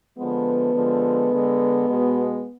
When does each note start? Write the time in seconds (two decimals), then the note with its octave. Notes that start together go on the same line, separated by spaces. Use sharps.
0.17 D3 F3 G#3 B3
0.74 D3 F3 G#3
1.31 D3 G#3
1.88 B2 G#3